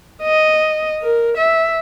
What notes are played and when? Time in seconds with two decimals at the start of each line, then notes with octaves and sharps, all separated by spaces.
0.23 D#5
1.02 A#4
1.37 E5